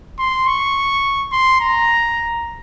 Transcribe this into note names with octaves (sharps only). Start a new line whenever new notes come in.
C6
C#6
C6
A#5